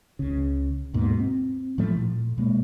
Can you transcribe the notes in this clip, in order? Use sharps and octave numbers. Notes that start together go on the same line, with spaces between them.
C#2 C#3
D#2 G#2 B2 A#3
C4
A2 F3 A3
A#2
B2 G#3 A#3